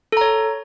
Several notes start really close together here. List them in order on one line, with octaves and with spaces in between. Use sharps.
A4 A#5 C#5